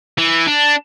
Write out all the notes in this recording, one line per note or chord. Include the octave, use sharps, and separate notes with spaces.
E3
D4